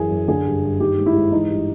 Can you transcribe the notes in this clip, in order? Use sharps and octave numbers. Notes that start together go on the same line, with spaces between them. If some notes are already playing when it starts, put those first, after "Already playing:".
Already playing: F#2 E3 G#4
F#2
D3 G#4
G2
G2
D#3 G4
G#2
E4
G#2
E3 D#4
G2